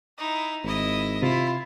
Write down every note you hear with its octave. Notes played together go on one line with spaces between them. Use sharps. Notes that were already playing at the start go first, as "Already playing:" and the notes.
D#4 E4
G#1 E4 D#5
C3 E4 F4